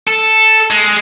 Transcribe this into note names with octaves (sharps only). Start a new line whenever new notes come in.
A4
G#3